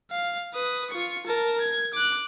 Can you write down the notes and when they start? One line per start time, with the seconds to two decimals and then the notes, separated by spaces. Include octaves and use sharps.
0.11 F5
0.54 B4 D#6
0.90 F4 C#6
1.26 A#4 A5
1.61 G#6
1.93 D6 F#6